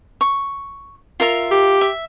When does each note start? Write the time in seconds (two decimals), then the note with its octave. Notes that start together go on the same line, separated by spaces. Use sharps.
0.21 C#6
1.20 F4 A#4 E5
1.51 G4
1.81 E5